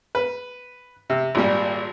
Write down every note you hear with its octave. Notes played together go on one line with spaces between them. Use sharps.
B4
C3
G#1 A#2 G3